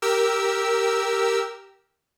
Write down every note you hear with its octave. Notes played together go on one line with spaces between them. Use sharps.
G4 A#4 E6